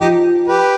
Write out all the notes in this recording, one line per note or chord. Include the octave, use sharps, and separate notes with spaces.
F3 D#4 G4
G4 B4